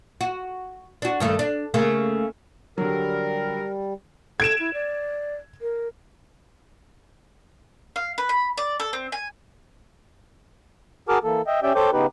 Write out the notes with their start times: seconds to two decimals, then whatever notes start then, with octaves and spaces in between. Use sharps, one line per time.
0.21 F#4
1.02 D4 F#4
1.20 G2 D#3 A3
1.39 D4
1.74 C#3 A3 A#3
2.78 D3 F#3 G3 A#4
4.40 A4 G#6 D7 E7
4.60 E4
4.74 D5
5.61 A#4
7.96 F5
8.18 B4
8.29 B5
8.57 D5
8.80 A4
8.93 C4
9.12 G#5
11.09 F#4 G#4 A#4 A5 D6 F6
11.24 E3 A#3 A4
11.47 D#5 E5 G5
11.63 C#4 G4 D5 E5 G5
11.75 A4 C5 C#5 G5 D6 G6
11.93 C#3 B3 D#4 G4 B4